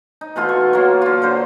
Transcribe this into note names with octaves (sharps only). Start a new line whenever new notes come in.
D#4
B2 E3 A3 F4
C#6
F#3 A#3
D3 F4
D3 F#3 C5